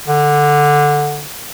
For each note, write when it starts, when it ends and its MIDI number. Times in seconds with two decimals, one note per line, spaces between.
0.08 1.26 50